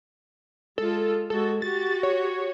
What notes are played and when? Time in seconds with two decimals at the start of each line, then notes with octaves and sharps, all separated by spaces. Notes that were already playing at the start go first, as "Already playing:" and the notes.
0.78 G#3 F4 A4
1.30 G#3 F#4 A4
1.62 F#4 G4 A6
2.03 C#5